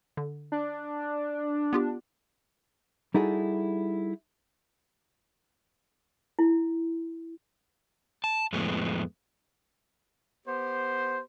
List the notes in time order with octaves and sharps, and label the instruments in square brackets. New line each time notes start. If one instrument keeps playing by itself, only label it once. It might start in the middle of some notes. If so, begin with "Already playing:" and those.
[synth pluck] D3
[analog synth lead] D4
[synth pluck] B3 F4 G4
[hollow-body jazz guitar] G3 D#4 E4 F#4 G#4 A4
[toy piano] E4
[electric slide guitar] A5
F2 A2 G#3 A3 B3
[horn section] B3 G4 C5